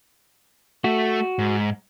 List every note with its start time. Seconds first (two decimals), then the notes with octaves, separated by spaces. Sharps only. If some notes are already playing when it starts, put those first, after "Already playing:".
0.84 A3 F#4
1.39 G#2